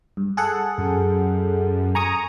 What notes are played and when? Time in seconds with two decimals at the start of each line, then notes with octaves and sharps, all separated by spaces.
0.17 G2
0.37 G#4 A4 F#5
0.78 F#2
1.95 G#5 A#5 C#6 D#6